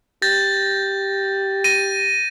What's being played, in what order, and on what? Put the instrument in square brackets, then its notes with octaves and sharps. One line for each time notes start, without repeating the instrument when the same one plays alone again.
[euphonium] G4 [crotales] G6 A6 A#6
[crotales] A#6 D#7